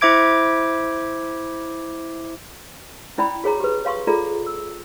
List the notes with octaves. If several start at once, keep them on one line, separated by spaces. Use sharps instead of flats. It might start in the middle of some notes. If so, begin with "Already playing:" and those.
E4 C5 E5 D6 G#6 D7
C#4 E4 D5 G5 B5
F#4 G#4 C#5 A#5
G4 B4
C#5 F5 C6 C#6 D#6
F4 G#4 A4 D5 A#5
E6